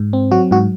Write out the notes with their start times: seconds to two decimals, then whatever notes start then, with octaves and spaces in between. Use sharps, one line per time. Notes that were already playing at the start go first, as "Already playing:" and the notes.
Already playing: G#2
0.13 C4
0.31 F#3 F#4
0.51 G#2 F#4